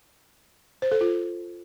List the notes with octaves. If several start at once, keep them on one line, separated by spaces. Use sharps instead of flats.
C5
A4
F4